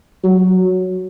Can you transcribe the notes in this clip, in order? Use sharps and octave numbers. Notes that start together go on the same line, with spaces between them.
F#3